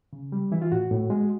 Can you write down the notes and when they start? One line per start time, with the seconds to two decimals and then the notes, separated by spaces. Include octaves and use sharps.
0.13 C#3
0.32 G3
0.52 E3 E4
0.62 F4
0.72 A2 F#4
0.91 A2
1.10 G#3